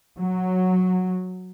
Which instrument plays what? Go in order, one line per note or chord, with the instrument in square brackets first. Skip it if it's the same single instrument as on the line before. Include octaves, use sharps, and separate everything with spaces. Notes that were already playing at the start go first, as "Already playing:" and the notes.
[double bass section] F#3